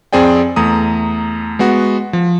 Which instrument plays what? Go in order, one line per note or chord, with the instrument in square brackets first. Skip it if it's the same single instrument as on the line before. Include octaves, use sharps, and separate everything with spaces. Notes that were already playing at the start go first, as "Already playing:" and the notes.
[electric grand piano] F2 C4 G#4 D5 G5
E2 A3 A#5 D#6
G#3 B3 F#4
F3